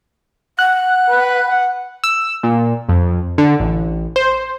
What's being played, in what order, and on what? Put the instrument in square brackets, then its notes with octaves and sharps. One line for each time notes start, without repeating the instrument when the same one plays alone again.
[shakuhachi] F#5 [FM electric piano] F#6
[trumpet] B4
F#5
[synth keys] E6
A#2
F2
D3
A1
C5